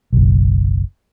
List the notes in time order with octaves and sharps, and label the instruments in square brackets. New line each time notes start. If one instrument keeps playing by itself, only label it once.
[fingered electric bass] F#1 B1